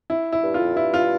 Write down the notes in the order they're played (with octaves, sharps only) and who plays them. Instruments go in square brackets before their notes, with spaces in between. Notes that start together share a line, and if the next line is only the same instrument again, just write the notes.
[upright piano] E4
E4
[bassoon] G2
[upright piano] F4
[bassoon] F2
[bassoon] G2 [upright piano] E4
[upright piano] F4